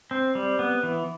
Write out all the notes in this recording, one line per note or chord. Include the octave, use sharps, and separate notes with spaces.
C4
G3
B3
E3